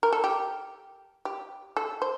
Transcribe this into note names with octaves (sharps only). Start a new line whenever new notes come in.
A#4
A4
G4
G4
A4
C5